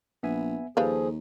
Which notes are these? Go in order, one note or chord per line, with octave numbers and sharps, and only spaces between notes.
A#1 B3 E5 G#5
D#2 F3 G3 G#4 A4 B4 F5